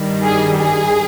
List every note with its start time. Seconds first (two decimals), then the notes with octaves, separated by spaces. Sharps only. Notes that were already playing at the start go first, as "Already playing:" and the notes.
Already playing: G2 D#3 G3
0.25 G#4
0.57 G#4